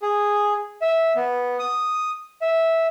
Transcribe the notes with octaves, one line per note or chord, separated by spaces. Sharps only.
G#4
E5
B3
D#6
E5